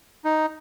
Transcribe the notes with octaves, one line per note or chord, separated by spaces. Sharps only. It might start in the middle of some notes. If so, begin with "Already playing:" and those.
D#4